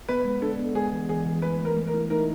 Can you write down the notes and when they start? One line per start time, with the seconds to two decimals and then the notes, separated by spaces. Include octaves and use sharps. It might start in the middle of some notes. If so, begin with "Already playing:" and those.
0.09 B3 B4
0.25 G#3
0.42 D4 A4
0.59 B3
0.75 G#3 G#4
0.92 E3
1.09 E3 G#4
1.26 E3
1.42 A3 B4
1.59 A3
1.65 A#4
1.77 A3
1.87 A#4
1.94 E4
2.10 D#4 A#4